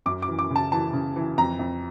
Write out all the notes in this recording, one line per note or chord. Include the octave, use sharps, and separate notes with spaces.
F#2 D6
D6
E3
D6
C#3
A5
E3 A5
C#3
E3
F2 A#5
F2